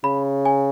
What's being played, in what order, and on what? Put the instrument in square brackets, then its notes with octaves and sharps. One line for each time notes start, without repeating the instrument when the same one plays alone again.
[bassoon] C#3 [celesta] B5
[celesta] G#5